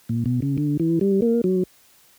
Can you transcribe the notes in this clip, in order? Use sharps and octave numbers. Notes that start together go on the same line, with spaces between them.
A#2
B2
C#3
D3
E3
G3
A#3
F#3